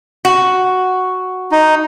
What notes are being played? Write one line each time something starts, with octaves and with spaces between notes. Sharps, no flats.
F#4
D#4